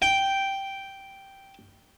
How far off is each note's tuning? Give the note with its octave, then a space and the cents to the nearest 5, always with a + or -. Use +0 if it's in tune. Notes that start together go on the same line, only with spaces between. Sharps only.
G5 -5